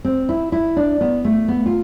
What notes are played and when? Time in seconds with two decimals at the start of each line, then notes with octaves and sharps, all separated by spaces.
0.05 C4
0.29 E4
0.52 E4
0.76 D4
1.01 B3
1.25 A3
1.48 B3
1.66 F4